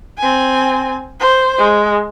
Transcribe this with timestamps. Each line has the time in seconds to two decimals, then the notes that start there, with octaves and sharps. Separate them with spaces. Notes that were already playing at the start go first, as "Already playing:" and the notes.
0.19 C4 G#5
1.20 C5
1.58 G#3